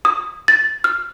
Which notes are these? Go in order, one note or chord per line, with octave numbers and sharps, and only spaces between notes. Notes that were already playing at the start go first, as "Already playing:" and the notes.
D#6
A6
F6